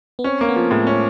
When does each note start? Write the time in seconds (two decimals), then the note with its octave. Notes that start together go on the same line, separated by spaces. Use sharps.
0.19 B3
0.24 C4 C#4
0.41 A#3
0.49 B3
0.56 F3
0.71 A2 G#3
0.87 C#4